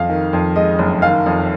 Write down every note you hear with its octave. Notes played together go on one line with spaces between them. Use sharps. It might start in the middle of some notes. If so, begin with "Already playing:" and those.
Already playing: F2 F5
D#3
F2
G#3 D#5
F#1
D#3 F5
F2